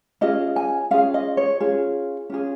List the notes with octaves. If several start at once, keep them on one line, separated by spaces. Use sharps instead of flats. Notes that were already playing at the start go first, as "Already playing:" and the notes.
C#4 F4 G#4 D#5
G#5
C#4 F4 G#4 F5
D#5
C#5
C#4 F4 G#4
C#4 F4 G#4